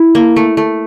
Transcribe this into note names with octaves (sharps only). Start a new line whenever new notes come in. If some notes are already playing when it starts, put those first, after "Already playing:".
Already playing: E4
A#3
A3
A3